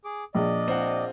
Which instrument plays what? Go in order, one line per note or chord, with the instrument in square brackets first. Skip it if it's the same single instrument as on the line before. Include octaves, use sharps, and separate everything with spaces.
[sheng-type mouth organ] G#4 D6
[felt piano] A#1 [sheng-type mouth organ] D5 D#5
[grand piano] C4 F4 F#5